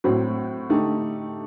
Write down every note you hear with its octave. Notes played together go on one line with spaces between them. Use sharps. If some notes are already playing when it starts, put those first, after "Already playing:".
A2 F#3 C4 F#4
D3 A3 D#4 G4